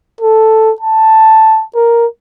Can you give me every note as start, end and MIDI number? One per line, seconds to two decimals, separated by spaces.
0.21 0.71 69
0.81 1.63 81
1.75 2.06 70